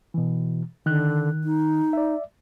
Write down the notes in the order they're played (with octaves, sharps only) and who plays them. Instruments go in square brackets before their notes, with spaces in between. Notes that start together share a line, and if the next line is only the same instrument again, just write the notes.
[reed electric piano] B2 E3
[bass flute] D3 [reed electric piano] D#3 F#6
[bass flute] D#4
[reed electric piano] D5 E5